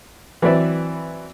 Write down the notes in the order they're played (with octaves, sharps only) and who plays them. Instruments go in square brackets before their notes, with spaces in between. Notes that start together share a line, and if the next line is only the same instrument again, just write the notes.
[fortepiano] E3 F#3 C4 B4 D5 E5